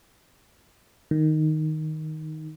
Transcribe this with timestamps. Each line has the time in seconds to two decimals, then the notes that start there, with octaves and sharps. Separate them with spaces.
1.11 D#3